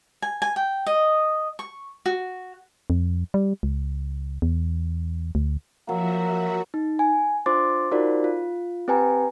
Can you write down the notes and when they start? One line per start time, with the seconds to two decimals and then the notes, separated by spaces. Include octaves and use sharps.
0.22 G#5
0.42 G#5
0.56 G5
0.86 D#5
1.59 C#6
2.06 F#4
2.90 F2
3.34 G3
3.63 C#2
4.42 E2
5.35 D2
5.87 F3 F#3 A#3 F#4 E5
6.74 D#4
6.99 G#5
7.46 D4 F4 C5 C6 D6 A6
7.91 D#4 F4 F#4 A#4 C5 D5
8.24 F4
8.88 C4 G4 B4 G5 G#5 A#5